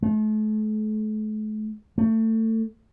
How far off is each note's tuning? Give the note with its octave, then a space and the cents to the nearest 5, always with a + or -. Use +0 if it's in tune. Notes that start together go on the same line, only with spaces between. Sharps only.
A3 -40
A3 +25